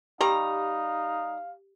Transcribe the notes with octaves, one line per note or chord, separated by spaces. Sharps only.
G3 D#4 G4 F5 A#5